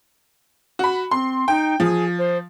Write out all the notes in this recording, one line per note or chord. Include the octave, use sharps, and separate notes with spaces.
F#4 B5
C4 C6
D#4 G5
F3 G#4
C5